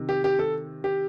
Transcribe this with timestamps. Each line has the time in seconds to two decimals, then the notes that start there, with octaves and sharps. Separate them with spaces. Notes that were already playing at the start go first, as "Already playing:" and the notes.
Already playing: C3 D#3
0.09 G4
0.24 G4
0.39 A4
0.84 G4